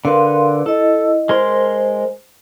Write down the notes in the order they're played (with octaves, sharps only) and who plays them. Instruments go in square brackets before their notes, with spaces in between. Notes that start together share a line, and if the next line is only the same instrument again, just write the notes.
[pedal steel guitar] D3 B4 [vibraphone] A#4 F5 C6
[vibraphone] E4 D#5 [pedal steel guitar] A4
[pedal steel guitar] G#3 A#4 C6 [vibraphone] C5